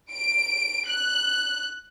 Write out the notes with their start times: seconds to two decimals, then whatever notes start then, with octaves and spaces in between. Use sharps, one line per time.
0.12 D7
0.88 F#6